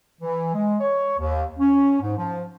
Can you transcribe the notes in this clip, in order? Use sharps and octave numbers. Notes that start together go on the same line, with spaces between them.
E3
G#3
C#5
D#2
C#4
G#2
F3